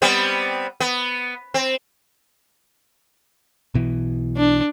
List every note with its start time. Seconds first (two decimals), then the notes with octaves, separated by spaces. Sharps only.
0.02 G3 B3 C4
0.80 B3
1.54 C4
3.74 B1 B2 E3
4.37 D4